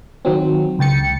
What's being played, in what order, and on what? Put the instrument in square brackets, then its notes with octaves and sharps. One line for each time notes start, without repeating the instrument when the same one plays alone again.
[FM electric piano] D#3 F#3 C4
C#2 G5 A6 C#7